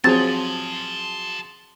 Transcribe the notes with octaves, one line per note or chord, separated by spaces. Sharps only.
F3 F#3 C4 G#4 A5 C6 A6